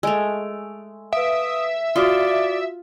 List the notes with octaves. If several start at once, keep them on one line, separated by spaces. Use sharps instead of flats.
G#3 A3 E6 D7 F7
B4 E5 F5 D#6 D7
F4 F#4 D5 D#6 G7